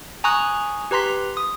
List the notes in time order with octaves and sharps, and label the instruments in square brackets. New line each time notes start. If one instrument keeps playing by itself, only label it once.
[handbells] G#5 A#5 C#6 D#6 F#6
G4 B4 A#5 C6 B6
D#6